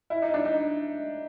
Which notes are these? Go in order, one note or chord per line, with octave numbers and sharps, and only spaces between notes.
E4
D#4
D4
D#4